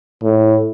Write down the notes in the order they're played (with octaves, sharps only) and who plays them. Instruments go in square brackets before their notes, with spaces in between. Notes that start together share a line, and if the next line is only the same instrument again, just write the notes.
[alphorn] A2